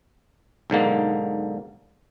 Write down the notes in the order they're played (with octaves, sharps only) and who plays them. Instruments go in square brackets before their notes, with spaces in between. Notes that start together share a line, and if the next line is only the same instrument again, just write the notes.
[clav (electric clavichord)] B1 G#2 D3 A#3